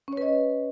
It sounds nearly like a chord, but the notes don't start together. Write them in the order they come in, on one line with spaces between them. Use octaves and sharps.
C#4 C#5 B4 D#5